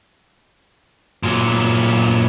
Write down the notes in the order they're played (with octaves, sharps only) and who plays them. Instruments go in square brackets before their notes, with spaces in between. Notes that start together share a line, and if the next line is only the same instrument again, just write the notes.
[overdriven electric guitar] A#2 F#3